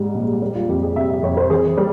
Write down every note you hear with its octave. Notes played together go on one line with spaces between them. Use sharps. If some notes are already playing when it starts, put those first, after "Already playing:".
Already playing: G#2 G3
A#1
G3
F4
F2 G4
G#4
C3 E5
E5
F2 C#5
C5
E3 G#4
G3